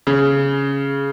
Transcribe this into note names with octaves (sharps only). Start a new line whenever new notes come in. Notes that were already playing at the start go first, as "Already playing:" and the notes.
C#3